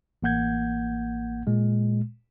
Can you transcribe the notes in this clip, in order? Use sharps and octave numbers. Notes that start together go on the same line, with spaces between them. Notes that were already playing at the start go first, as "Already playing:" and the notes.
A1 A#3 F#5 G6 G#6
A#2 G#3